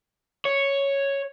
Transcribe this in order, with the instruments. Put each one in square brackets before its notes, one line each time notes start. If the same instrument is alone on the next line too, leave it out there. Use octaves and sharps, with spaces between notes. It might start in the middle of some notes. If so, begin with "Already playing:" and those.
[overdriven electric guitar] C#5